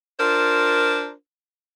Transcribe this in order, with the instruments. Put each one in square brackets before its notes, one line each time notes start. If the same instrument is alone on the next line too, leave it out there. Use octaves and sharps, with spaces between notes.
[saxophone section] D4 F4 A#4 C5